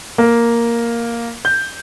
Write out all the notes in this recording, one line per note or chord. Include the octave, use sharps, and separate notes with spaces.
A#3
G6